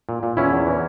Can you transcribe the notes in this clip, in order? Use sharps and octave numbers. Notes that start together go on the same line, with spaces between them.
A#2
A#2
E2 C#4 E4
E2
E3